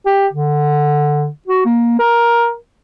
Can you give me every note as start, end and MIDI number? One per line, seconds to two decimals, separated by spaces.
0.06 0.27 67
0.33 1.28 50
1.47 1.62 66
1.65 1.98 58
1.99 2.51 70